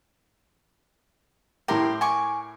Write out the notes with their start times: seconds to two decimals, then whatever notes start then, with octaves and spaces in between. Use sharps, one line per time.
1.68 A2 E4 G4 A#4 A#5 C6
2.01 G#5 C#6 D6